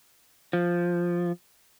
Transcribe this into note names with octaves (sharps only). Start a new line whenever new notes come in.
F3